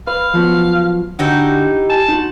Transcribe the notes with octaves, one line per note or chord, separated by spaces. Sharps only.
B4 F5
F3 F#3 B3
D3 D#4 E4 F#4 G4
G#5 A5
D#4 F#4